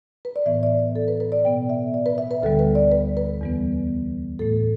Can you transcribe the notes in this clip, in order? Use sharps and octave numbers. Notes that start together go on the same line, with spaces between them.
B4
D5
A2 E3 B3 E5
D5
A4
B4
B4
D5
B2 B3 G5
E5
D5
B4
E5
B4
D2 D3 G3 B3 A4
B4
D5
B4
B4
E2 E3 G3 B3
A2 E3 A3 A4